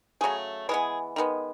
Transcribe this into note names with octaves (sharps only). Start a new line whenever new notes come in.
C#3 F#3 A3 G#4
E3 G#3 B3 G#4
D#3 G#3 B3